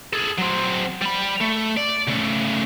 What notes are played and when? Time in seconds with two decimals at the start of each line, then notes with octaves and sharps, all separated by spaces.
0.13 G#4 A4
0.38 F#3 C4
1.01 G3 B5
1.41 A3
1.77 D5
2.07 C#3 A3